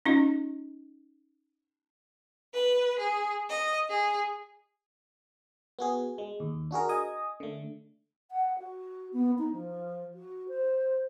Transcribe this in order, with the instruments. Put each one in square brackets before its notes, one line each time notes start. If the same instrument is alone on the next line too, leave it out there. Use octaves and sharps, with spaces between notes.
[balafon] C#4 D#4 F4 D#5
[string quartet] B4
G#4
D#5
G#4
[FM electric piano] B3 F#4 G#4
G#3
D#2
D4 F#4 G#4 A#4
D#5 G#5 D#6
D3 A3
[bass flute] F#5
F#4
B3
D#4
F3
F#4
C5